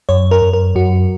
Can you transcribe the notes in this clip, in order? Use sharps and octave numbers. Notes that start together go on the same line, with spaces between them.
F#2 C#5
A#4
F#2
A#4
F#2 F#4